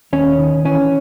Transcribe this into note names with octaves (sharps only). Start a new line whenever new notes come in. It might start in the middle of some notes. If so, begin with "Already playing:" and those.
D#2 C#4
D#3
E3 C#4